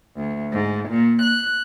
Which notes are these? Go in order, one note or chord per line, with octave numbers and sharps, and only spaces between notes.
D2
G#2
A#2
F#6